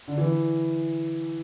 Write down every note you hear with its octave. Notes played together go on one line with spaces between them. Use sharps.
D3
E3